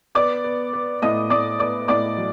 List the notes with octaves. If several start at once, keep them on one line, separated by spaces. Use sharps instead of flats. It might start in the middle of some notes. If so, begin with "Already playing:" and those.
B3 D5 D6
B3
B3
A2 D#5 D#6
A2 D5 D6
B3 D5 D6
A2 D5 D6
F#3